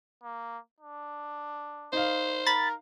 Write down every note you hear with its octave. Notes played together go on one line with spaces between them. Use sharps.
A#3
D4
D#4 C5 F5
A#4 B5 A6